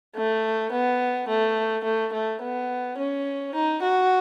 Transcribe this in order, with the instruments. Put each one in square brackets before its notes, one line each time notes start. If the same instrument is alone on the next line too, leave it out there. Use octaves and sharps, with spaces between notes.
[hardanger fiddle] A3
B3
A3
A3
A3
B3
C#4
D#4
F#4